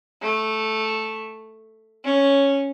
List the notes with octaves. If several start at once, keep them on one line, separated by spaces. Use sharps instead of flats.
A3
C#4